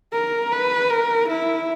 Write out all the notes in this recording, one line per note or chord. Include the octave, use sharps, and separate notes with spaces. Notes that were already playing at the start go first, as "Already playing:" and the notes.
A#4
B4
A#4
E4